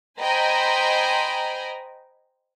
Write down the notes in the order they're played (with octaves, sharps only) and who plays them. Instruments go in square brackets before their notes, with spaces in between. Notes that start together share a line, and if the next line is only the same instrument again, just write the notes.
[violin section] C5 D#5 G5 G#5 A#5 B5